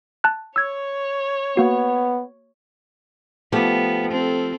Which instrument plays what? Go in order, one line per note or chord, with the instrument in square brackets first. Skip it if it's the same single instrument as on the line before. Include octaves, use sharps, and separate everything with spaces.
[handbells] A5 F#6
[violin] C#5 [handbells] E6 G#6
[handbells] A#3 F#4 [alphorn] B3
[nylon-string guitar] F3 A3 G4 [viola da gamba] B3
[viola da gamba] C4 A4